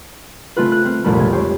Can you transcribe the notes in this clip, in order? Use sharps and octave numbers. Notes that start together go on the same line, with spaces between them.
C#3 A3 C4 F4 B4
F#6
C4 F6
F1 C2 A#2 A3 D4 B5
C#3 G#3 G#6
G4 C5 C#5